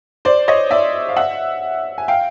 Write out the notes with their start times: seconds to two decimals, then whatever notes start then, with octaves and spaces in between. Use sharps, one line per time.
0.25 C5 D5
0.48 C#5 D#5
0.71 D5 E5
1.09 F5
1.16 E5 F#5
1.98 G#5
2.08 F5 G5